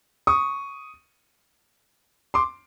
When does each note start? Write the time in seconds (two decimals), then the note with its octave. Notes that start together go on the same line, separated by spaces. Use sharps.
0.27 C#6 D#6
2.34 C6 D6